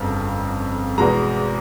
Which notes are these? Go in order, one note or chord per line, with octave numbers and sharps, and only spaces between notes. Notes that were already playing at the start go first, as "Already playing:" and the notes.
Already playing: G1 F2 C#3
E2 B2 G#3 A#5